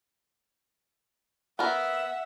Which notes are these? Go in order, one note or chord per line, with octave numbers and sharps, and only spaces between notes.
B3 A#4 E5 F#5